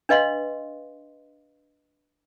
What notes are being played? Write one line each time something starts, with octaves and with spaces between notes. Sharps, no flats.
D4 B4 D#5 F5 C6